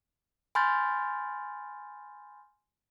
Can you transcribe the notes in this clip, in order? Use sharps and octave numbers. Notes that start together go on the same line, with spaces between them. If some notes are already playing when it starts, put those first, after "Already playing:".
G#5 B5 C6 F6 G6 A6